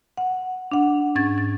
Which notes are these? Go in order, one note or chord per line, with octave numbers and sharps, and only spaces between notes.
F#5
D4 F#5
G#2 C#4 G#6 A6
A6